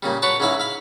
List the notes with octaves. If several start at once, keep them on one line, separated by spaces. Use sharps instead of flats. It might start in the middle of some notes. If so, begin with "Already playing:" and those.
A#2 C#3 G3
F#4 B4 C#5 A5
C#2 G#2 F#3 E4 F5 B5
F5 B5